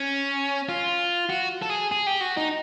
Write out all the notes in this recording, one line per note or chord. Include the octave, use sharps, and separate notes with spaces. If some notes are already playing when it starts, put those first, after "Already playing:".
Already playing: C#4
F4
F#4
A4
G#4
G#4
G4
F#4
D#4